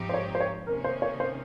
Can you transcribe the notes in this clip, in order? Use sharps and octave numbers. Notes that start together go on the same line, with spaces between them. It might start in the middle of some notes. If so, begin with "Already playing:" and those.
Already playing: G#2 F3 C4 D#4 G4
C5
C#5
C5
C#5
C3 D#3 A#3 C#4 A#4
C5
C#5
C5